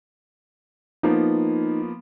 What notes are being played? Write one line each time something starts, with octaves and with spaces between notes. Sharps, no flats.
F3 A#3 B3 D#4